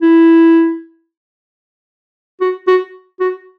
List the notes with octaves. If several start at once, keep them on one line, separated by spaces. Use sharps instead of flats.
E4
F#4
F#4
F#4